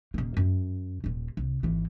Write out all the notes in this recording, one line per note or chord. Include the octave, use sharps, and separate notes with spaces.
D#1 A#3
F#2
D#1 A#2
C2
G#1 E3